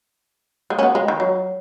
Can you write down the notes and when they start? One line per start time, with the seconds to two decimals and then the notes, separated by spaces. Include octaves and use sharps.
0.70 G#3
0.79 C#4
0.83 B3
0.95 G#3
1.08 D#3
1.20 F#3